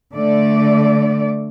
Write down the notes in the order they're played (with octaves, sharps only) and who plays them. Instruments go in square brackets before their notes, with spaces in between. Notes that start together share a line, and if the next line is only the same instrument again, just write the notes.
[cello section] D3 A3 D5